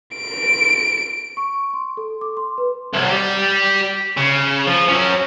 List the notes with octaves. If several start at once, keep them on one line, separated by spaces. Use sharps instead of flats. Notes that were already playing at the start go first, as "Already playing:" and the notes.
D7
C#6
C6
A4
D6
C6
B4
C2 F#3
G4 D5
C#3
F3
F#3 C#4